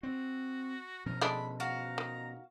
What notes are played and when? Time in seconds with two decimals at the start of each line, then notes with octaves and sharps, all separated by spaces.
0.03 C4 F#4
1.06 B2 F3 C#4 A#4
1.21 G#3 A3 D4 B5
1.60 F#4 F5 A#5
1.98 D#3